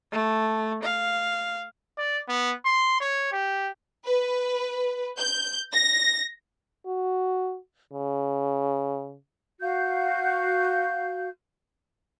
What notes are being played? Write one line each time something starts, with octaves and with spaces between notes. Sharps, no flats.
A3
F5
D5
B3
C6
C#5
G4
B4
G6
A#6
F#4
C#3
F#4 F5 G6